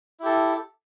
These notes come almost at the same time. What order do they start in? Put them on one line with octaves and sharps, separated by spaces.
E4 G4 A4